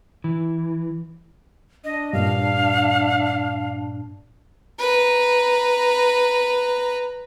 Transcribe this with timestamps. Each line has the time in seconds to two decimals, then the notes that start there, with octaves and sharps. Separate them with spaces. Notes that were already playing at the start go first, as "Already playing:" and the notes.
0.24 E3
1.84 D4 D#5
2.13 G2 A#2 F5
4.79 B4 A#5